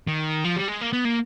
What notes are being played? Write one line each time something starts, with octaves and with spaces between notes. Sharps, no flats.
D#3
F3
G3
G#3
A#3
B3
A#3